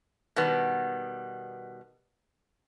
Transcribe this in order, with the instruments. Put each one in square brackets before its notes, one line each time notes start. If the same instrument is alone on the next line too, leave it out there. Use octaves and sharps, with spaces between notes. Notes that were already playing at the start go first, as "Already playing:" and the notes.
[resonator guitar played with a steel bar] B2 D#3 G3 B3